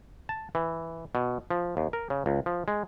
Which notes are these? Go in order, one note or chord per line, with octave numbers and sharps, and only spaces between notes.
A5
E3
B2
F3
D#2
A#4
C#3
C#2
F3
G#3